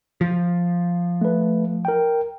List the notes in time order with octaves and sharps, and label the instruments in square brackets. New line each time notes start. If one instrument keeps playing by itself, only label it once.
[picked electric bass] F3
[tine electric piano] A3 B4
A#4 G5